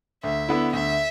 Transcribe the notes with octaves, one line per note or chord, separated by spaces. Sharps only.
D2 E5
D3 B3 E4
D2 E5